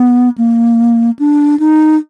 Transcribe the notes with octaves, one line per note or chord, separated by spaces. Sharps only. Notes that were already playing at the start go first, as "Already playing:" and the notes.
Already playing: B3
A#3
D4
D#4